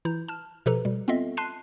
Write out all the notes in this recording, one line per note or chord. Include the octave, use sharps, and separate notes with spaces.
E3 E4 A#5 G6
A5 F6
B2 F3 G4 A4 B4 A#5
B2 G3
B3 C4 F4 A4 D#5 E5
A5 C6 F#6 C7 D#7